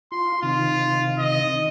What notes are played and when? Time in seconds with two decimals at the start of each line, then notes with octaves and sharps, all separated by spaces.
0.12 F4 C6
0.42 C3 D#3 F4
1.19 D#5